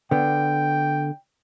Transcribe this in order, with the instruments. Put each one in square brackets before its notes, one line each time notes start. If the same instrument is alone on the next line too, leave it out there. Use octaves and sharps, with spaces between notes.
[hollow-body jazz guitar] D3 B3 [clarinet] G5